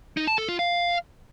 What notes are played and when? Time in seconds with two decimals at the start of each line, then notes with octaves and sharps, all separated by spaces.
0.17 D#4
0.27 A5
0.38 A4
0.49 F4
0.59 F5